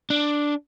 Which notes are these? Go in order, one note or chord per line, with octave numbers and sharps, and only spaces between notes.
D4